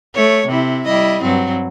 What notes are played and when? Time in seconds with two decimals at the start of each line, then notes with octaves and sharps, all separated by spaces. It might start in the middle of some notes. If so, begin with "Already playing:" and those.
0.14 A3 C#5
0.47 C3 E4
0.85 G3 E4 D#5
1.21 G2 F#3 C4